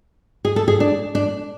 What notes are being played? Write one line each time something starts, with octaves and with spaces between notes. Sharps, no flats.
G#4
A4
G#4
D4
D4